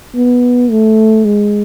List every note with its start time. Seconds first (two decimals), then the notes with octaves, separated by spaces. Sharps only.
0.15 B3
0.71 A3
1.25 G#3